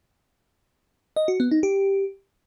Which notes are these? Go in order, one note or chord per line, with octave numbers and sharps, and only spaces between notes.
D#5
F#4
B3
D#4
G4